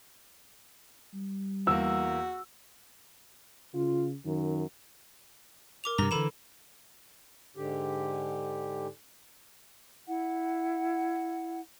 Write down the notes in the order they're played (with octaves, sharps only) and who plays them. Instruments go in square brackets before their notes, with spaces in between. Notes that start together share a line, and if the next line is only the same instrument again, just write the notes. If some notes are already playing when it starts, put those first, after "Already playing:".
[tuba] G3
[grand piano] E2 A#3 [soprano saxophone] F#4 [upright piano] E6
[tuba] C#3 [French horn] F4
[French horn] F#2 [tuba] D#3
[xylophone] A#4 D6 F7
[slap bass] G2 C3 [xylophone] A#5
[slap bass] D3 E3 [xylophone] A4 B5 E7
[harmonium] G#2 D3 G4
[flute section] E4 F#5